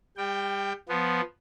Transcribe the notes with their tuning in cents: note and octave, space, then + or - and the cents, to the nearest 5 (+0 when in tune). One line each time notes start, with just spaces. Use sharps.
G3 +30 G5 +0
F3 +0 B3 +0